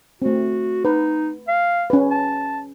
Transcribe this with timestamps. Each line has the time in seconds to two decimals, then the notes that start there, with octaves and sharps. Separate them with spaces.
0.22 A3 C4 F#4
0.85 D#4 B4
1.48 F5
1.90 C#4 B4
2.11 A5